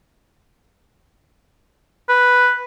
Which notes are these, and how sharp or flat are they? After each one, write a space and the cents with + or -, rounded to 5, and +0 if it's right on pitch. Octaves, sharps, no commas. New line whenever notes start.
B4 +0